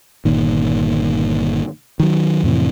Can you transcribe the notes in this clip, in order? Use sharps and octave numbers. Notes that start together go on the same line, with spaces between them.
G1 A#2 D#3
D#3 F#3
F2 A2 C3 E3